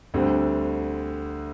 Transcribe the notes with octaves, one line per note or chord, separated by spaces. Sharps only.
D2 D3 G3 C4